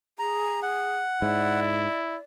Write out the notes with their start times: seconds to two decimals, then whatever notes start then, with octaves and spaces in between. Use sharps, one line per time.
0.19 G#4 A#5
0.62 F#5
1.22 G#2 E4 D5